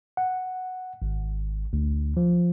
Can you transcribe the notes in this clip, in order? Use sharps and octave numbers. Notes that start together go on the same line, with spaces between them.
F#5
G#1
D2
F3